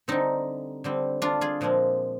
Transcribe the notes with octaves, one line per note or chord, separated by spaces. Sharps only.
D3 G3 C4 D#4
D3 G3 C4
D4 F4
F4 G#4
A#2 F3 G#3 C4